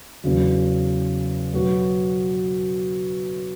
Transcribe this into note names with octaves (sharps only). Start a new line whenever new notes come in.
E2 C#3 F#3
B2 F#3 B3 F#4